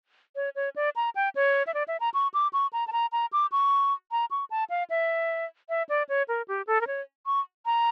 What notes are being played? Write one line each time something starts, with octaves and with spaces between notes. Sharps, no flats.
C#5
C#5
D5
A#5
G5
C#5
E5
D5
E5
A#5
C#6
D6
C#6
A#5
A5
A#5
A#5
D6
C#6
A#5
C#6
A5
F5
E5
E5
D5
C#5
A#4
G4
A4
A#4
C#5
C#6
A#5